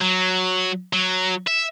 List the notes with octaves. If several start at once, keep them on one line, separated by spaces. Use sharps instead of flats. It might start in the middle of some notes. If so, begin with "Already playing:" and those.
F#3
F#3
E5